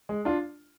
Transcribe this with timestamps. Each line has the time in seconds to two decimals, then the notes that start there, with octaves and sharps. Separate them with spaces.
0.09 G#3
0.25 D4 F4